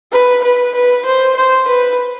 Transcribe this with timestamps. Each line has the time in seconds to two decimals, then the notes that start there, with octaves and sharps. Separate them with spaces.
0.12 B4
0.44 B4
0.75 B4
1.06 C5
1.37 C5
1.68 B4